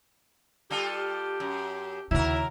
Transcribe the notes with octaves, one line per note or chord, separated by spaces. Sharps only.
G3 F4 G4 A4
F#2
D#2 C#3 F#3 E4 A#4